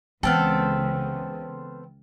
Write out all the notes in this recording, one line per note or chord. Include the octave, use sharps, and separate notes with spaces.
C#2 C#3 E3 B3 C4 A4 G5 F6